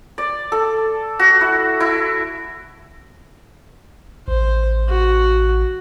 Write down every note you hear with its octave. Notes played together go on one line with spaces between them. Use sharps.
D5
A4
F#4
E4
E4
A1 C5
F#4